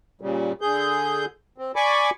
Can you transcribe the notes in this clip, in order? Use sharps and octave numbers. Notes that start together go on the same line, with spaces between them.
A#2 C#3 G3
D3 G#4 G6
C4
D5 G#5 B5 C#6 D6